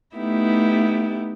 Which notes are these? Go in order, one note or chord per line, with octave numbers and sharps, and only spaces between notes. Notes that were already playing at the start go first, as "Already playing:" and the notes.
A3 B3 D#4 E4 G4